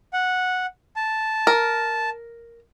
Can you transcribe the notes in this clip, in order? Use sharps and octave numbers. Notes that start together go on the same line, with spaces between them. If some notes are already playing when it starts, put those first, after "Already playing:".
F#5
A5
A#4